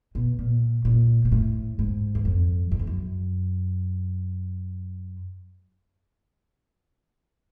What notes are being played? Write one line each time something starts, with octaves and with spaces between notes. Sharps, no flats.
B2
A#2
A#2
A#2
A2
G#2
E2
F2
F#2
F2
F#2